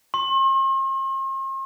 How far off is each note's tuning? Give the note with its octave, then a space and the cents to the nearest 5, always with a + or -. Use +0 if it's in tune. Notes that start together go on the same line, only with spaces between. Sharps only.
C6 +45